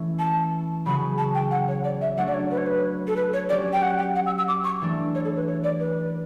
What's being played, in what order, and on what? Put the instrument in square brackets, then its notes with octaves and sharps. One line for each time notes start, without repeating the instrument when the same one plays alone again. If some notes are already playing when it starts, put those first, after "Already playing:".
Already playing: [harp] E3 A3 C#4 E4
[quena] A5
[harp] C#3 F#3 B3 F#4 [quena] B5
[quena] A5
G5
F#5
C#5
D5
E5
[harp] F#3 A3 D4 F#4 [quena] F#5
[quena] D5
C#5
B4
C#5
B4
A4
B4
C#5
[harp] F#3 C#4 G4 [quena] D5
[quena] G5
F#5
G5
F#5
E6
E6
D6
C#6
[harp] E3 A3 D4
[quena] C#5
A4
B4
C#5
D5
B4